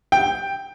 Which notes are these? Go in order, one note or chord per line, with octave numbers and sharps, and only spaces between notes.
G5